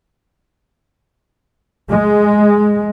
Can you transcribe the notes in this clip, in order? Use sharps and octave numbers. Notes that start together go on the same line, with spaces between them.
G#3